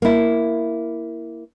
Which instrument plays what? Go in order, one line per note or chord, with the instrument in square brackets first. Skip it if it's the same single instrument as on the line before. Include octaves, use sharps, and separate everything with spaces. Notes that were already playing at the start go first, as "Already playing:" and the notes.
[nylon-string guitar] A#3 E4